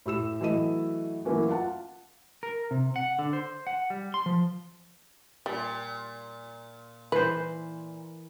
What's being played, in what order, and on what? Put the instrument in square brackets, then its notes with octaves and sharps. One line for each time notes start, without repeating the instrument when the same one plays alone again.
[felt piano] A2 G4 E6 E7
E3 F#3 A3 D#5 D#7
E3 F#3 A3 A#3 C#4 F#4
F4 F5 F#5 A5
[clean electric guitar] A#4
C3
F#5
D3
C5
F#5
G3
C6
F3
[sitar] A#2 [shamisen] G3
[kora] E3 C5 [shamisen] B4